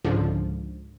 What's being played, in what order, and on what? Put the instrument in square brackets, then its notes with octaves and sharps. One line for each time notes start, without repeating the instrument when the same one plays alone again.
[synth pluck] C#2 G#2 D3 F3